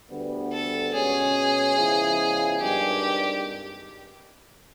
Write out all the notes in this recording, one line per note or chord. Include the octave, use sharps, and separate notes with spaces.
D2 D3 G3 B3
A4
B2 G#3 C#4 G#4
C#3 F3 G#3 B3 E4
G#1 G2 D#3 G3 G4